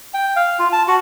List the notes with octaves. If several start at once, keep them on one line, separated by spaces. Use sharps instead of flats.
G5
F5
F4
A5
F#4